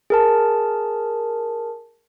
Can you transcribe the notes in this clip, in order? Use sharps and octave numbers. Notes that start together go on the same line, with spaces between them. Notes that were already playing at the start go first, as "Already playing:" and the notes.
G#4 A#4 A5